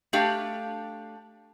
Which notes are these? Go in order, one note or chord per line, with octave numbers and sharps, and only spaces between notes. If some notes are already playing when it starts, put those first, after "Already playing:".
A3 D4 G4 F5